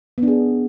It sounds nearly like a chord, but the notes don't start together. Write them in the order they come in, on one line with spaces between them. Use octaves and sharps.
B3 D4 G#4